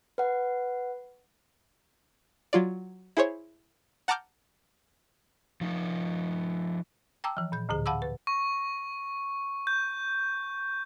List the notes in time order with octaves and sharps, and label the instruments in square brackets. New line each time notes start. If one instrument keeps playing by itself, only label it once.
[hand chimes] B4 F#5
[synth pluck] F#3 F4 D5
E4 G#4 C5 C#5
F#5 A5 A#5 D6 F6 G6
[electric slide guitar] F3 D#4
[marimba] G5 A5 A#5 D6 E6
E3 F3
A#2 G6
D2 A2 D3 G#4
F5 F#5 A5 B5 D6 E6
B4
[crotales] C#6
G6